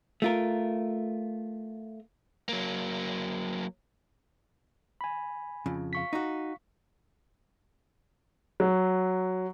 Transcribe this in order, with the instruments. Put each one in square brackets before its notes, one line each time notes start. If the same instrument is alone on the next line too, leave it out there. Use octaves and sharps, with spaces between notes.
[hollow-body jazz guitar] A3 F4 A#4
[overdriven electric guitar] F#3 A#3
[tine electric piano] G#5 B5
[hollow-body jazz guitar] F2 C#3
[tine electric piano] F5 C#6 B6
[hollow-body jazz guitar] D#4 F#4
[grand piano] F#3